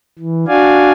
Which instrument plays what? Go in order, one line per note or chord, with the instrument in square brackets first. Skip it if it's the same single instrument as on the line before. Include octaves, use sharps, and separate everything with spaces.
[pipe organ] E3
D4 F#4 D5 F5 G#5